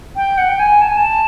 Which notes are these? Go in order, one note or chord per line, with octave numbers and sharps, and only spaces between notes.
G5
F#5
G5
G#5
A5
G#5
A5